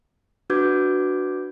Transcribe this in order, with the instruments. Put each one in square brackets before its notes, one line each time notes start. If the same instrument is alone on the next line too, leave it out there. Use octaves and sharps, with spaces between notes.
[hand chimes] D4 F#4 B4 D6 G6 G#6